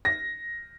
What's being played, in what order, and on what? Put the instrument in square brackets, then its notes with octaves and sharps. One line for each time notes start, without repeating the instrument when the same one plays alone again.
[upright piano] A#6